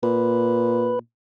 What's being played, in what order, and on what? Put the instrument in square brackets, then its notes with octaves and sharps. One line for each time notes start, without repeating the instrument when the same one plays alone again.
[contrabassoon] A#2 [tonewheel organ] B4